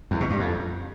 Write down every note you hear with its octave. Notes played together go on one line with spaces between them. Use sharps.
E2
B2
G2
F2